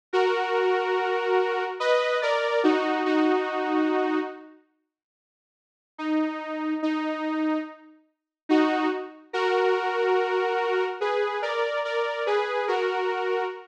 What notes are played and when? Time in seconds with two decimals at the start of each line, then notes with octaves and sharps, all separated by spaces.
0.13 F#4 A#4
1.80 B4 D#5
2.22 A#4 D5
2.64 D#4 F#4
3.06 D#4 F#4
5.98 D#4
6.83 D#4
8.49 D#4 F#4
9.33 F#4 A#4
11.01 G#4 B4
11.42 A#4 D5
11.85 A#4 D5
12.26 G#4 B4
12.68 F#4 A#4